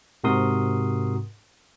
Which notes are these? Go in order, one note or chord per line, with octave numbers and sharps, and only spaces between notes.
G#2 C3 F#4 A#4 C6 D#6